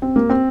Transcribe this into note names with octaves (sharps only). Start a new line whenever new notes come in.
C4
A#3
C4